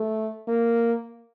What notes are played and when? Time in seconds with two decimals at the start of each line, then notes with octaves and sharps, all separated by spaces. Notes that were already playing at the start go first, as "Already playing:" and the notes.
Already playing: A3
0.48 A#3